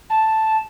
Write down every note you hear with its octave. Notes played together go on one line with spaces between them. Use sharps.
A5